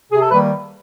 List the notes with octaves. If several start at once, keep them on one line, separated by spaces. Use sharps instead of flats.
C3 G#4
A4
D#3 G3 A#3 B4